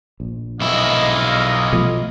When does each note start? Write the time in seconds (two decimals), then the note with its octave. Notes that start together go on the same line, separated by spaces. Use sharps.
0.20 A#1
0.61 B1 E4 D#5 F5
1.73 B2 F3 A3